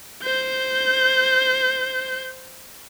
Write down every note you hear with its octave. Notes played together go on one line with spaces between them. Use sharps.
C5 G6